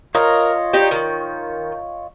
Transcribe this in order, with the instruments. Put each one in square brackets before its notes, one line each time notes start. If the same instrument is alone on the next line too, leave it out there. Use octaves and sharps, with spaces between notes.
[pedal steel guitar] F4 C#5 D#5 [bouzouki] A#4
[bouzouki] D#4 G4
D#3